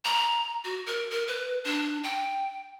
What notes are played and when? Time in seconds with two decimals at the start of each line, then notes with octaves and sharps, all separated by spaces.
0.05 A#5
0.64 F#4
0.86 A#4
1.11 A#4
1.28 B4
1.65 D4
2.04 G5